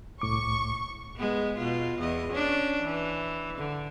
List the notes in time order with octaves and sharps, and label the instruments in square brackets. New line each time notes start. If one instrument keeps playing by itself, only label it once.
[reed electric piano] C2 A2 D6 [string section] C#6
[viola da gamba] G#3 B3
B2 F4
E2 D#5
C#4 D4
E3
D3